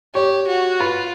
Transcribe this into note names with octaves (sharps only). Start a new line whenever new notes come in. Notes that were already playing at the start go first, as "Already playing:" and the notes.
G4 C#5
F#4
F4 B4